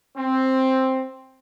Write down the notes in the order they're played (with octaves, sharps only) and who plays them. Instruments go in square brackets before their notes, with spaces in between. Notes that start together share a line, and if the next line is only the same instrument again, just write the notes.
[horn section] C4